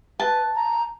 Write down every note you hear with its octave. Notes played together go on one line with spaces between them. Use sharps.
B4 A5
A#5